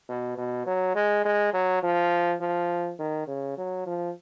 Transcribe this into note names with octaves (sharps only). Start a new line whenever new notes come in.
B2
B2
F#3
G#3
G#3
F#3
F3
F3
D#3
C#3
F#3
F3